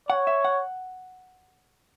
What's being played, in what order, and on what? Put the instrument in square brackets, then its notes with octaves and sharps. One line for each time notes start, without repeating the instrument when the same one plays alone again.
[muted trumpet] C#5 [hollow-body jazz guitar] F#5
[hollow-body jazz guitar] E5
F#5